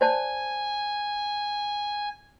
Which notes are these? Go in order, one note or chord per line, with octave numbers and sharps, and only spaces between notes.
C5 D5 G#5 A5